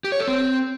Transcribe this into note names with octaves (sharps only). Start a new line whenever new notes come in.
G4
C#5
A4
C4